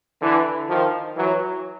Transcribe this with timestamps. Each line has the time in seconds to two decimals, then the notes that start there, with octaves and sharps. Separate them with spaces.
0.22 D3 E3
0.69 D#3 F3
1.16 E3 F#3